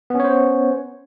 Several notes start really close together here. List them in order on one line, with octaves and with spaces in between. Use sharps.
B3 C#4 C#5 C5